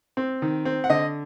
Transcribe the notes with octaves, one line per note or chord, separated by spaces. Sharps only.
C4
D#3
C4
F#5
D3 D#5